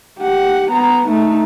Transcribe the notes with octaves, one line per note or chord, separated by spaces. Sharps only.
G4 F#5
B3 A#5
A3 D#4